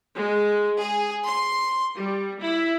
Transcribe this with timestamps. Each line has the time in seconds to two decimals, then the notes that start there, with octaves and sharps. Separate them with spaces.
0.16 G#3
0.79 G#4
1.26 C6
1.97 G3
2.40 E4